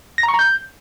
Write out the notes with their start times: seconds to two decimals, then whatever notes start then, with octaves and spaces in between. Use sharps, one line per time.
0.18 A#6
0.23 A#5
0.29 C#6
0.34 A#5
0.39 G6